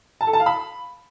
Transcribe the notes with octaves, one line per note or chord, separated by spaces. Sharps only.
A5
A4
A5
F5
B5